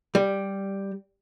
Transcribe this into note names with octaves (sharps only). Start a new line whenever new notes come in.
G3